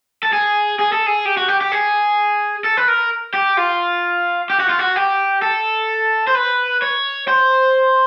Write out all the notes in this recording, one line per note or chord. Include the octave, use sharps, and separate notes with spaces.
A4
G#4
G#4
A4
G#4
G4
F#4
G4
G4
G#4
A4
B4
A#4
G4
F4
G4
F#4
F4
F#4
G4
A4
C5
B4
C#5
C5